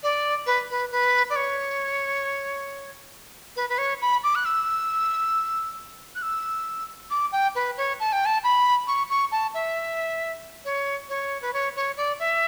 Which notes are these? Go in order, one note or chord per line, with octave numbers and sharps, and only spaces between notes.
D5
B4
B4
B4
D5
C#5
B4
B4
C#5
B5
D6
F#6
E6
F#6
E6
D6
G5
B4
C#5
A5
G5
A5
B5
C#6
C#6
A5
E5
C#5
C#5
B4
C#5
C#5
D5
E5